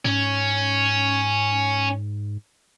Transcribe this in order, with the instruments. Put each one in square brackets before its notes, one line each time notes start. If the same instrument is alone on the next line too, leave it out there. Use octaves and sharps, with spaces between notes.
[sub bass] G#2 [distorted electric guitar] C#4